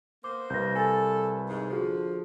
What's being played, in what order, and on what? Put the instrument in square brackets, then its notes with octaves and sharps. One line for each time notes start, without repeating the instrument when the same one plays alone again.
[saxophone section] A#3 B3 C5 [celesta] D6
[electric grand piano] C2 B4 [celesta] G6 A#6
[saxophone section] A4 [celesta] G#5 A6
[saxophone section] G#2
[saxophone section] D3 F3 [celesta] F#4 G#4